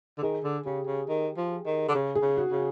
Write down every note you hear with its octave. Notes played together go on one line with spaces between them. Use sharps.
D3
D#3 G#4
D3
C#3 G4
C#3
D#3
F3
D#3
D3
C#3
G#4
C#3
F#4
C#3